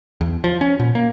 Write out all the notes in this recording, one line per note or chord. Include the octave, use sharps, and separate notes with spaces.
E2
F3
C#4
A#2
A#3